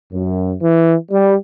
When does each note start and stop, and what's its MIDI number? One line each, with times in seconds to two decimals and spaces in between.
0.13 0.53 42
0.62 0.94 52
1.11 1.35 55